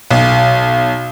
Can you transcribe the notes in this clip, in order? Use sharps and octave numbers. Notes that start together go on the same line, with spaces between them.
B1